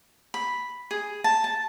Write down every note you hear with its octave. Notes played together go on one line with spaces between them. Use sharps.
B5
G#4
A5
A5